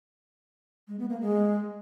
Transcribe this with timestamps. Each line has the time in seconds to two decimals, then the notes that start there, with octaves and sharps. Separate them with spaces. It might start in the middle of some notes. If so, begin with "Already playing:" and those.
0.88 G#3
0.99 B3
1.10 A#3
1.21 G#3